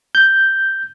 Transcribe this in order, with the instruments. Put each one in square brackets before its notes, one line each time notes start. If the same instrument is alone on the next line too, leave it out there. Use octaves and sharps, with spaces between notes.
[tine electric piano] G6